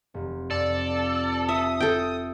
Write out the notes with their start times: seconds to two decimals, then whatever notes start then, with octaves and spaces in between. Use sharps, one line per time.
0.14 F1
0.51 F2 A4 D5
1.49 E5 D#6
1.80 A4 G5